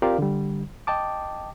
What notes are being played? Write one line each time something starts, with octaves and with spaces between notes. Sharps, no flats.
C4 F4 G4 A#4 D5 F5
D3 G3
D#5 G5 A5 D6